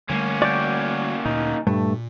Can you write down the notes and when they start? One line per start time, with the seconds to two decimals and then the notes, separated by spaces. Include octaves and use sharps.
0.10 D3 G3 A3 A#3 C#4
0.42 F#4 D5 G5
1.25 D2 A#2 D#4
1.67 G2 A#2 A3